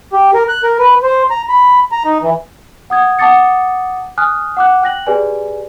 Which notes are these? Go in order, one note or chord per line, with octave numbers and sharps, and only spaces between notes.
G4
A#4
F#6
A#4
B4
C5
A#5
B5
A#5
D#4
E3
F#5 D#6 G#6
F#5 A5 D6 D#6 A6 C#7
G#5 D#6 F6 F#6
F#5 D6 F#6
G5 F#6 A#6 F#7
G4 G#4 B4 D5 G#5